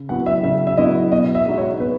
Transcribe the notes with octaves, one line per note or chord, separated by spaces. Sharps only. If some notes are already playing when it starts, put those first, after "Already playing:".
Already playing: C#3
F#3 B3 E4 F#5
E5
C#3 E5
E5
F#3 B3 E4 D#5
B2 D#5
E5
G#3 D#4 F#4
C#5
B2 B4